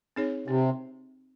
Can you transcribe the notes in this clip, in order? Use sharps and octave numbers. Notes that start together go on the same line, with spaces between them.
C4 D#4 G#4 C#5
C3 C4